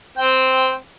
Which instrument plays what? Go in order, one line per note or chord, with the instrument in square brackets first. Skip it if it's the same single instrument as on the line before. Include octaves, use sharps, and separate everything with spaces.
[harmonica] C4 G5